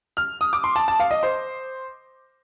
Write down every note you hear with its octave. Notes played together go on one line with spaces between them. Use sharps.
F6
D#6
D6
C6
A5
A5
F5
D#5
C5